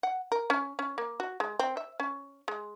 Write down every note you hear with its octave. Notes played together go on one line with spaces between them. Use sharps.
F#5
A#4
C#4
C#4
A#3
F#4
G#3
C4
E5
C#4
G#3